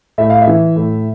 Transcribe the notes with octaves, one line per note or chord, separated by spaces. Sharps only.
A2 E5
F5
E5
E3
A2